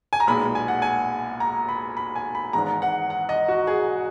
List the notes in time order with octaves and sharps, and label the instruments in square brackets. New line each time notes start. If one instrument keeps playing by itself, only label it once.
[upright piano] G#5
A#5
B1 A#2 G#3 B5
G#5
F#5
G#5
A#5
B5
B5
G#5
B5
G#1 G#2 E3 G#3 A#5
F#5
F#5
D#5
F#4
G#4